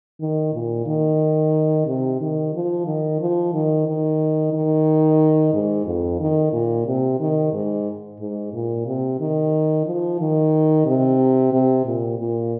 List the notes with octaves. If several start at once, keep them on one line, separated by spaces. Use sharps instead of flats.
D#3
A#2
D#3
C3
D#3
F3
D#3
F3
D#3
D#3
D#3
G#2
F2
D#3
A#2
C3
D#3
G#2
G#2
A#2
C3
D#3
F3
D#3
C3
C3
A#2
A#2